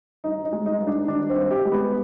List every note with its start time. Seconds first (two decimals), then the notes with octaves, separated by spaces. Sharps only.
0.24 G2 D#4
0.45 D#4
0.52 G#3
0.66 D#4
0.80 G2
0.87 D4
1.08 D#3 D4
1.29 C4
1.37 G2
1.51 G4
1.65 G#3
1.72 B3